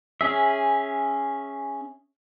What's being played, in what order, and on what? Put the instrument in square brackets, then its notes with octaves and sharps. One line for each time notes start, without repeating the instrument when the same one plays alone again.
[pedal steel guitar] C#4 G#4 E5